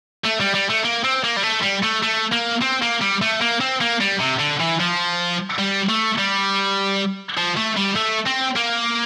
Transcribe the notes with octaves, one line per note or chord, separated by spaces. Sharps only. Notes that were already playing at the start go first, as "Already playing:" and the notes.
A3
G3
G3
A3
A#3
C4
A#3
G3
A3
G3
A3
A3
A#3
C4
A#3
G3
A3
A#3
C4
A#3
G3
C3
D3
E3
F3
G3
A3
G3
F3
A3
G3
A3
C4
A#3